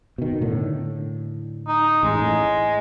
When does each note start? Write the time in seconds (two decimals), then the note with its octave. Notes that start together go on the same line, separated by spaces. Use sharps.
0.18 B2 D#3
0.42 A2 D3
1.68 D#4
2.03 A1 G#3
2.21 A2